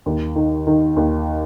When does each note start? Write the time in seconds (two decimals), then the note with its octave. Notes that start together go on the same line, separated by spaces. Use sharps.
0.06 D#2
0.36 D#3
0.67 D#3
0.96 D#2